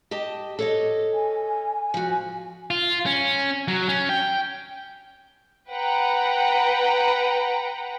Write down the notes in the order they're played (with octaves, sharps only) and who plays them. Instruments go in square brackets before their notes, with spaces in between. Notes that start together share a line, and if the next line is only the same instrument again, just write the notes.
[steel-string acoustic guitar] G4 D#5 A5
A4 C#5 D#5
[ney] G#5
[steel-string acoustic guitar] F3 F#4
[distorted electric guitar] F4
C#4
F#3
C#4
G5
[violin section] B4 F#5 G5 A#5